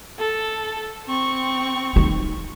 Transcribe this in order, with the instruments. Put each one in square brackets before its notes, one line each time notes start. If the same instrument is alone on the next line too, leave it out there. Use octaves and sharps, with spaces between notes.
[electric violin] A4
C4 C#6
[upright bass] D#4